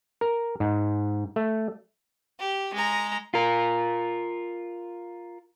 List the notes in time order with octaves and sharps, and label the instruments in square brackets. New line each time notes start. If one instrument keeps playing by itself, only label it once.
[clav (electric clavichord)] A#4
G#2
A3
[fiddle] G4
G#3 A#5
[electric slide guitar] F4 A#4